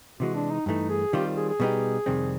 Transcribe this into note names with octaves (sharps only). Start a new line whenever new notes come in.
C3 E3 G#3 F#4
D4
D#4
G2 E3 A3 D#4
G#4
D#3 G3 C4 F4 G4
G#4
G#4
B2 G3 B3 D#4 G4
F2 C3 D#3 G3 C4